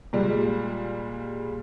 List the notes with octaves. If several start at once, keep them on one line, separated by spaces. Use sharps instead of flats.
A#2 G3 G#3